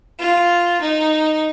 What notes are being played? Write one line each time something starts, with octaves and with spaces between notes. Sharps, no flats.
F4
D#4